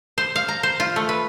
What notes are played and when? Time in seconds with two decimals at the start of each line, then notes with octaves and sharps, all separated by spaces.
0.18 C5
0.36 F5
0.48 A#5
0.63 C5
0.80 F4
0.96 A3
1.09 B4